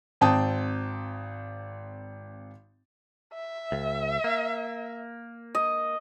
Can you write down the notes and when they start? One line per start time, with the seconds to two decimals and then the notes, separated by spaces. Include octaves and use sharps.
0.21 G#1 C4 G5 A5 D#6
3.34 E5
3.72 C#2
4.24 A#3
5.55 D#5